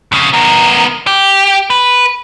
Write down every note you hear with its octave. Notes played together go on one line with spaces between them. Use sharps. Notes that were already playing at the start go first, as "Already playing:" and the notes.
F2 C#3
B3 A#4
G4
B4